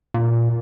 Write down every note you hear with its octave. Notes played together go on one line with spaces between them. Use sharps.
A#2